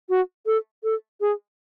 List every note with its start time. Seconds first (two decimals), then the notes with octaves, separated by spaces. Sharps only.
0.09 F#4
0.46 A4
0.83 A4
1.21 G#4